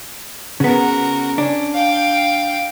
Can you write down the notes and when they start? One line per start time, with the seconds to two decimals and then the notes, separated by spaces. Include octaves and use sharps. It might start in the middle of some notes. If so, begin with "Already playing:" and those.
0.60 C#3 B3 F#4 A#4
1.38 C#4 D4
1.74 F5 G5